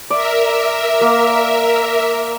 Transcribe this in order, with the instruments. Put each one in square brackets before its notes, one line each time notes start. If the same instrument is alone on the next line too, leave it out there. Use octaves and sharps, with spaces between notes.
[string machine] A#4 E5 [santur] D5
[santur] A#3